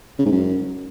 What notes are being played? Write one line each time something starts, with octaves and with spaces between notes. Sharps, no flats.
C#3
G#2
F#2